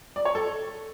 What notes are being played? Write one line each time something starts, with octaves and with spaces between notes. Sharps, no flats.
D5
C#5
A4